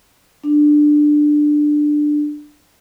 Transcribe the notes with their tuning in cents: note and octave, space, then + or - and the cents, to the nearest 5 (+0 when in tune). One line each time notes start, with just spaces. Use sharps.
D4 +15